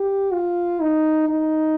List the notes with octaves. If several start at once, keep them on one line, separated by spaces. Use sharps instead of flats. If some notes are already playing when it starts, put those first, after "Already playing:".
Already playing: G4
F4
D#4
D#4